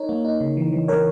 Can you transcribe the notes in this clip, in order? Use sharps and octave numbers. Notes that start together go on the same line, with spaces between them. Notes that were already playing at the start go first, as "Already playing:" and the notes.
Already playing: D#4 A#4 C#5
A#3
D#4
C#3
E3
E3
E3 A#4 C#5